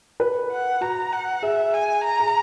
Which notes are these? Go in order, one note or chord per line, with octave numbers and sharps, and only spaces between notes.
B4
F#5
F#4 A#5
F#5
G#4 E5
G#5
A#5
G#4